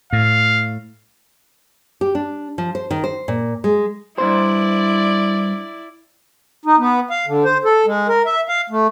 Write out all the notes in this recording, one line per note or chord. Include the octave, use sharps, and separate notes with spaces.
A2 F5
G4
D4
F3
C5
D#3
C5
A#2
G#3
G2 B2 E4 C5 D5
D#4
B3
F5
D3
C5
A4
G#3
A#4
E5
F5
A3